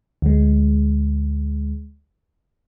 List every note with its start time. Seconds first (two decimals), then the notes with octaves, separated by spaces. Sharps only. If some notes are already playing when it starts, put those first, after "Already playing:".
0.22 D2 G#3